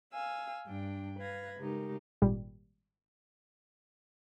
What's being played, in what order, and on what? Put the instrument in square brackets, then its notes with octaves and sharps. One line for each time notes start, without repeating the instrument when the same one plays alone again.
[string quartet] F5 G#5 E6
G2 D4 G5
B4 F5 G#6 A#6
C#3 G#3 D#4 G4 A#4
[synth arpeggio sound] G#1 A#2 G3